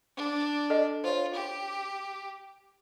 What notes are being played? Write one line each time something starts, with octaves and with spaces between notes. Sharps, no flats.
D4
A4 D5 D#5
F4 C5 C#5
G4